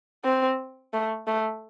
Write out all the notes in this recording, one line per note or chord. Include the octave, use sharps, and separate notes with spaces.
C4
A3
A3